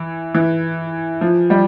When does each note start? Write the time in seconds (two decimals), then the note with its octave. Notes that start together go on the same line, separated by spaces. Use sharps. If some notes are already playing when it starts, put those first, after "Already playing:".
Already playing: E3
0.35 E3
1.21 F3
1.50 G3